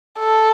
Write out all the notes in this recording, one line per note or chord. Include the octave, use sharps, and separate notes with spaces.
A4